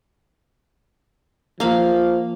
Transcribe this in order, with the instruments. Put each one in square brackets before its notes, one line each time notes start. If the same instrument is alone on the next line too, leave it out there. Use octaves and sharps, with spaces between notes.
[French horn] F3 [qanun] A#3 F5